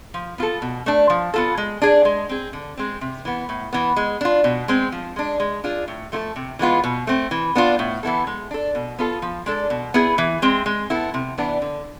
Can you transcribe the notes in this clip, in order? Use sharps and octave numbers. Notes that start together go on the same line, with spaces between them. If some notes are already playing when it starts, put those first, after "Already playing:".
F3
B3 F4 A4
B2
A3 D4
F3
B3 F4 A4
G#3
D4 G#4
G#3
C4 G#4
D3
G#3 C4
C3
E3 B3
A2
E3 B3
G#3
D4 F4
B2
G#3 C4
F3
G#3 D4
G#3
D4 F4 G#4
A2
F3 A3 E4 A4
C3
E3 G#3 B3 F4
B2
A3 C4
E3
B3 D4 F4
A2
E3 B3 E4 A4
G#3
D4 A4
B2
B3 F4 A4
F3
G#3 D4 A4
B2
B3 E4 G#4
E3
G#3 C4
G#3
B3 E4 A4
C3
E3 B3 D4
D3